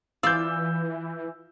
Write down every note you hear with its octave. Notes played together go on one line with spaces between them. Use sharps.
E3 F4 D5 F5 E6 G6